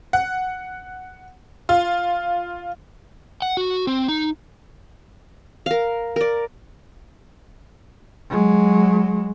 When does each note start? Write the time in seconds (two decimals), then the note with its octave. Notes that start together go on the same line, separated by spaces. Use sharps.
0.13 F#5
1.69 F4
3.42 F#5
3.57 F#4
3.87 C4
4.08 D#4
5.66 A#4 F5
6.16 A#4 D5
8.30 F#3 G#3